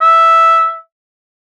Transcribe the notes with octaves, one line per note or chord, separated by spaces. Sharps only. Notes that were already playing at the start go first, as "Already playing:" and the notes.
E5